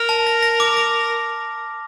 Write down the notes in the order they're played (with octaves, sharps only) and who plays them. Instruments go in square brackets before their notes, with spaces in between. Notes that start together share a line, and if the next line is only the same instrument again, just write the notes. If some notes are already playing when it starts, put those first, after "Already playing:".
Already playing: [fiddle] A#4 [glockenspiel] F6
[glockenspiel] A5
A#6
A#6
D6
A#6